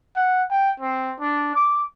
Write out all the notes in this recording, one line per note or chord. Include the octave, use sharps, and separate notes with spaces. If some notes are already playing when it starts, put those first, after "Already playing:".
F#5
G5
C4
D4
D6